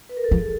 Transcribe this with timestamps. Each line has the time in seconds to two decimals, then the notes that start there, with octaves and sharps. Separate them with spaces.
0.09 B4
0.17 A#4
0.24 A4
0.31 F3 G#4